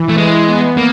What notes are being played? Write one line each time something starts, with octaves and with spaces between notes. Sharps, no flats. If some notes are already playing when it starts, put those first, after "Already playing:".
Already playing: E3
A3
G#3
B3
A#3